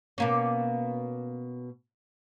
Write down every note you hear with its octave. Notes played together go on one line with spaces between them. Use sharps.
B2 A#3 C#4